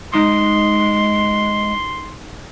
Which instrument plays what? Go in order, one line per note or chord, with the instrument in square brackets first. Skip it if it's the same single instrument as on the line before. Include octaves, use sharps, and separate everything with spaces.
[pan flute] G#3 [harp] D#4 D#6 [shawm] C6